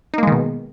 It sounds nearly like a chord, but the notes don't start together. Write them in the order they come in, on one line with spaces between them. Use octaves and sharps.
D#4 A#3 G#3 D#3 B2